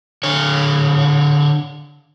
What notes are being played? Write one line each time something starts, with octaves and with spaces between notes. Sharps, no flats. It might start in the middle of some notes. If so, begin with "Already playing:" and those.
D3 C#5